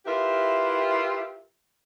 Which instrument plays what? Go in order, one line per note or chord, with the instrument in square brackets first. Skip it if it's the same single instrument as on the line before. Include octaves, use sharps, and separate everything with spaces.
[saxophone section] E4 F4 G4 A#4 B4 E5